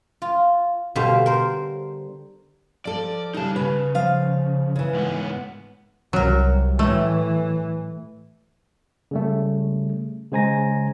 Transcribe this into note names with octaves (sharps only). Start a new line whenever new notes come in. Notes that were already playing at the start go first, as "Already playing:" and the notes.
F4
B2 D3 G3 C5 F5
A#4 C5
F3 A4 D5
C#3 G3 D#4 A5
C#3 B4
F3 F5
C#3 E3
G#2 B3
C2 F#3 A#4
A2 E3 A3
C#3 G3 A3
C#3 G#3 C5 G#5 A#5 A#6